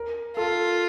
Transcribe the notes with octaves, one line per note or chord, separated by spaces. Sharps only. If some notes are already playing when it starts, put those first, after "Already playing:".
Already playing: A#4
F4 A4